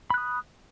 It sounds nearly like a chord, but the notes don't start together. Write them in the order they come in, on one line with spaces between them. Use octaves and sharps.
B5 F#6 D#6